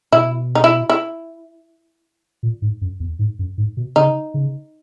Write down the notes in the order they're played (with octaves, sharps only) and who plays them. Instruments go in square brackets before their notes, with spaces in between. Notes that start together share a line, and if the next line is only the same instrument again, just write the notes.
[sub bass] B2 [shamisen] E4
[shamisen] D#4
E4
E4
[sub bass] A#2
G#2
F#2
E2
G#2
F#2
G#2
B2
[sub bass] C#3 [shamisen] D#4
[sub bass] C#3